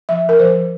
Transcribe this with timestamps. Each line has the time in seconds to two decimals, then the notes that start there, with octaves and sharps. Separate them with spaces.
0.09 F3 E5
0.25 F3 A#4
0.39 F3 C5
0.55 F3